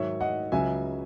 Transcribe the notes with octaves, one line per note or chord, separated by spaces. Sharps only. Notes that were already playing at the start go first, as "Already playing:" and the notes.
Already playing: G#2 D#3 F#3 C#5 E5
D#5 F#5
C#2 C#3 F#3 E5 G#5